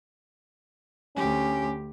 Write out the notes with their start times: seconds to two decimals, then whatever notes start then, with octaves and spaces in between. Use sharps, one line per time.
1.16 D2 C#4 G4